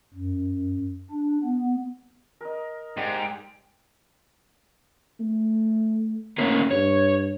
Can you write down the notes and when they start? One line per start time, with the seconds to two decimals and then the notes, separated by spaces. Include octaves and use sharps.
0.14 F#2
1.11 D4
1.43 B3
2.41 A#4 D#5
2.97 G#2 G4 D5 F5 G5
5.20 A3
6.38 A3 A#3 C#4
6.71 G2 C#5